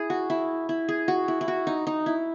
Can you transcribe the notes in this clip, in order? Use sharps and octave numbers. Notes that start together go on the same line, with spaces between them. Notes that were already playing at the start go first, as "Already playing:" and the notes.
Already playing: E4 G#4
F#4
E4
E4
G#4
F#4
E4
E4
F#4
D#4
D#4
E4